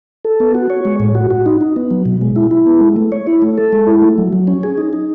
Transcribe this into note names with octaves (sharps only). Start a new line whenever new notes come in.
A4
B3
F#4
C#5
G#3
A2
F#4
F#4
D#4
D#4
B3
F#3
B2
G#3
E4
E4
B3
G#3
A3
C#5
E4
A3
A4
G#3
E4
A3
F#3
F#3
C#4
G#4
D#4
D#4